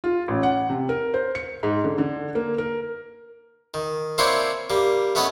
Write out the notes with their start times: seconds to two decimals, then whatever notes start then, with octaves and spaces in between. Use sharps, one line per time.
0.04 F4
0.28 A1
0.43 F#5
0.70 C3
0.89 A#4
1.14 C5
1.35 C#7
1.63 G#2
1.84 D3
1.98 D3
2.35 A#3
2.58 A#4
3.74 D#3
4.18 A#3 C4 D4 E4 C5 C#5
4.70 G3 A#3
5.15 A3 B3 C#4 B4 D#5